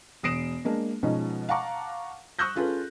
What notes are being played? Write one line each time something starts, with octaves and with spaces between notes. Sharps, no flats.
E1 D#6 A#6 C7 D7 E7
G#3 A#3 D4
B2 F3 G#3 C#4 D#4
F5 F#5 A5 A#5 C#6 D6
C#6 D#6 E6 F#6 G6 A#6
C#4 F4 G#4 A4 B4